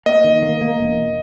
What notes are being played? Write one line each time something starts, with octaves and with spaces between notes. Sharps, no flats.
A#3 D#5
D#3
A#3
A#3
E1